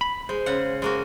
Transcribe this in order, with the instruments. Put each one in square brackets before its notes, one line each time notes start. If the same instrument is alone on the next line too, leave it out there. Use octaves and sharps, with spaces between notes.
[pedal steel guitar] B5
[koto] G#3 [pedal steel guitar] C5
[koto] C#3 F#5
G#3 A#3 F#4